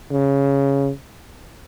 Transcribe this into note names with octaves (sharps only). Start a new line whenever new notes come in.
C#3